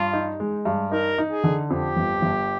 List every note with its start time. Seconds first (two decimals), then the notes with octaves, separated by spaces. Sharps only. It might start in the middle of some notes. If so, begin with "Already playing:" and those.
Already playing: G2 F4
0.13 D#4
0.40 G#3
0.65 G2
0.92 D#4 A#4
1.18 D#4
1.31 G#4
1.44 D3
1.70 F2 G4
1.96 G1
2.22 G1